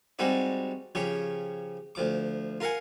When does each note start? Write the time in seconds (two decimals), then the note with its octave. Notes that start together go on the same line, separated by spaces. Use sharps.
0.19 G3 G#3 C4 D#4 F#4 D5
0.95 C#3 F3 G4 C#5
1.95 D2 F3 D6
2.60 F4 A#4 F5 F#5 G#5